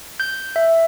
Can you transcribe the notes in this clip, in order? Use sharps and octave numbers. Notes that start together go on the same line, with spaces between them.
G6
E5